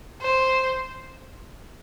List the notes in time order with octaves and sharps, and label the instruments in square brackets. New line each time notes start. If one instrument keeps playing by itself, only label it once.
[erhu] C5